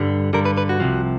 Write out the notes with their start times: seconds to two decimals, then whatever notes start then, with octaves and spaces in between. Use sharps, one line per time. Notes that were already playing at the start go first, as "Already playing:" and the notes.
Already playing: G2 D3 G3
0.33 G2 D3 G3 A#4
0.45 B4
0.57 B4
0.69 F#4
0.80 C2 C3 F3